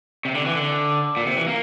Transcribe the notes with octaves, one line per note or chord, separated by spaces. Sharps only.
C3
D3
E3
D3
A#2
C3
E3
A#3